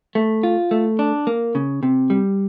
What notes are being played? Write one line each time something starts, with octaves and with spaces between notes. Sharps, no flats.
A3
F4
A3
D4
A#3
C#3
C3
G3